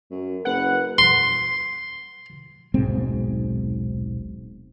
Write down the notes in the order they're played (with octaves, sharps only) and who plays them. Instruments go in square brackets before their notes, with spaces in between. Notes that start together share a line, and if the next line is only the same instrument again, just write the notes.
[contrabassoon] F#2
[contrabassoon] F#1 [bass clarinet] B4 [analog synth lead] F#5
[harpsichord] C6
[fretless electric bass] D#1 B1 G#2 C4